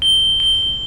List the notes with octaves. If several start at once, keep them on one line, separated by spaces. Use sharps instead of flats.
G7
G7